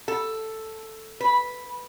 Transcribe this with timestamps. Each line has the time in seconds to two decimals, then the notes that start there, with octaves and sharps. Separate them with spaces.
0.08 A4
1.20 B4